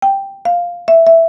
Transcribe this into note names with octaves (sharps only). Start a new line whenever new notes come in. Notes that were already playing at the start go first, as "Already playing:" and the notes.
G5
F5
E5
E5